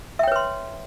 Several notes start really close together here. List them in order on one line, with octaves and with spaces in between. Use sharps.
E5 G5 C#5 B4 C6